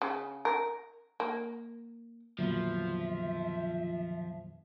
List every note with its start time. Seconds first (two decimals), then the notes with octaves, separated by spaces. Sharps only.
0.02 C#3
0.45 A#4
1.20 A#3
2.39 F2 A#2 D3 D#3 F3 F#3 B3 E5